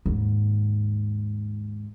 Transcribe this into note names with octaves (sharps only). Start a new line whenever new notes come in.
D#2 G#2